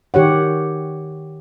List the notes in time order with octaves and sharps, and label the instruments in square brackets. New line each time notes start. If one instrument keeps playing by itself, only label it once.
[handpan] D#3 G4 C#5 F#5